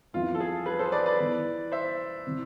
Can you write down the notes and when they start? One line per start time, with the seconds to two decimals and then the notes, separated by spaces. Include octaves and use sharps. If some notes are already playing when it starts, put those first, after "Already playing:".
0.13 F2 E3 B3 E4 F4
0.35 A4
0.40 G#4
0.66 G#4 B4
0.79 A4 C5
0.92 B4 D5
1.06 B4 D5
1.19 E3 B3 E4
1.72 C5 E5
2.26 C3 E3